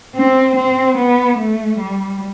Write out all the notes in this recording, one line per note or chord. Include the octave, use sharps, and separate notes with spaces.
C4
C4
B3
A3
G3